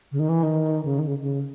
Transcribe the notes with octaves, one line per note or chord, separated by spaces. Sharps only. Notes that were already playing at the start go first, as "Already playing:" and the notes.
C#3
D#3
E3
D#3
C#3
D#3
C#3
C#3